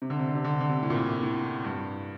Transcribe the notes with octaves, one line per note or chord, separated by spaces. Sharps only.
C3
D3
C3
D3
C3
D3
C3
D3
C3
A2
A#2
A2
A2
G2